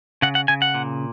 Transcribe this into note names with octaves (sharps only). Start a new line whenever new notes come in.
C#3 F#5
F#5
C#3 G#5
F#5
A#2